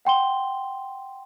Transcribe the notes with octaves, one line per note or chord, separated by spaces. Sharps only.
F#5 G5 C6 G7